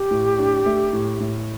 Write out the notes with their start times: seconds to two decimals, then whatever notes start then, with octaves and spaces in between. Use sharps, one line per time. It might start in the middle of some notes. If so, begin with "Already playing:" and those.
Already playing: G4
0.11 A2
0.38 D4
0.66 A3
0.93 A2
1.20 A2